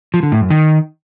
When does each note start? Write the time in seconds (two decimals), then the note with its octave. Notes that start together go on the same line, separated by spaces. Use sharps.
0.14 F3
0.23 D3
0.32 A2
0.41 F#2
0.50 D#3